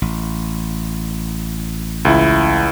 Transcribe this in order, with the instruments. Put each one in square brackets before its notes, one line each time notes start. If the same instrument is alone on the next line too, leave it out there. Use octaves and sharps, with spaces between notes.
[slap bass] A1
[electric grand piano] C#2 E4